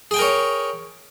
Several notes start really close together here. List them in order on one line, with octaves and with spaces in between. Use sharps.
G#4 G5 G#5 A#4 C#5